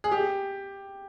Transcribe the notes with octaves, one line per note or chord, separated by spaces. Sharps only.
G#4
G4